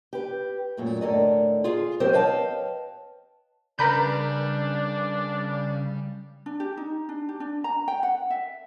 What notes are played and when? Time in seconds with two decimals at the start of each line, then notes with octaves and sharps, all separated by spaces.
0.13 G4 B4
0.77 F#2 A#2 A3
1.01 A2 D3 A4 A#4 D5 D#5
1.64 F4 G#4
2.00 F#3 C4 G4 A#4 C5
2.13 B4 C#5 D#5 F5 G5 A5
3.79 C#3 G3 D4 A#4 B4 B5 G6
6.46 D4
6.60 G4
6.77 D#4
7.09 D4
7.29 G4
7.40 D4
7.64 A#5
7.88 G5
8.03 F#5
8.30 E5